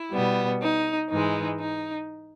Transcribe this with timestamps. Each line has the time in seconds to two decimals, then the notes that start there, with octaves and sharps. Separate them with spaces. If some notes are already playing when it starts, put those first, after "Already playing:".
Already playing: E4
0.12 B2 G3 B3
0.62 D#4
1.10 G#2 E3 G#3 D#4
1.59 D#4